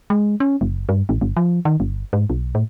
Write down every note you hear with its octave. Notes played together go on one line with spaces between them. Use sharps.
G#3
C#4
F#1
G2
A1
G1
F3
D#3
G1
G#2
B1
A2